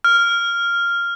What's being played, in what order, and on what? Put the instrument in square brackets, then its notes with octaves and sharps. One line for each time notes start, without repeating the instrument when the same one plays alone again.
[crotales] F6